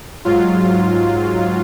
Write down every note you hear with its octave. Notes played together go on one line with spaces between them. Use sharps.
G#2 F#3 F4